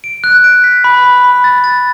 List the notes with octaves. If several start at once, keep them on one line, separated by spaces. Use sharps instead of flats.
D7
F#6
D7
B6
B5
B5
B5
A6
A6